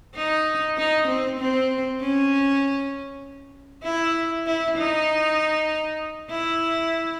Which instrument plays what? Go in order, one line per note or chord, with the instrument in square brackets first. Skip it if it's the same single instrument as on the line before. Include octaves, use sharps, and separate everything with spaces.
[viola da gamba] D#4
D#4
C4
C4
C#4
E4
E4
D#4
E4